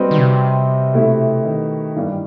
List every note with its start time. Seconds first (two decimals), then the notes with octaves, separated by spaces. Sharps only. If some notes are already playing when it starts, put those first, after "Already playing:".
Already playing: G3 C4 F#4 B4 D#5
0.11 D#3
0.18 C3
0.94 B2 A3 E4 G4
1.45 D#3
1.96 G2 E3 G3